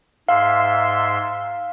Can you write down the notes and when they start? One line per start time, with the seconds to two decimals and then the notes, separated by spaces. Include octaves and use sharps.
0.29 G#2 E5 F5 C6